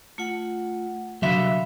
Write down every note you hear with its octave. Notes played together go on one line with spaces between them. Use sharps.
A3 F4 F#5
C2 D3 F#3 E5 F5 B5 C6